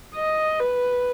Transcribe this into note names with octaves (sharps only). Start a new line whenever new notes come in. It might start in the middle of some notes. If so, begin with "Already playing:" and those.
D#5
B4